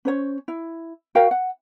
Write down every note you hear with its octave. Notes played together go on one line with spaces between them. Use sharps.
C#4 C5 C#5
E4
F#4 A#4 F5 G5
F#5